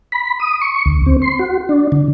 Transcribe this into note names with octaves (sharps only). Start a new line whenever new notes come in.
B5
D#6
C#6
D2
C4
C6
F#4
D4
D3